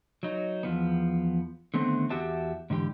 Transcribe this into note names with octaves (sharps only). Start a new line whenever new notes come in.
F#3 D#4
E2 F3 B3
D3 D#3 A3 B3 C4
E2 F#4 G4 E5 A5
G#2 D3 E3 G4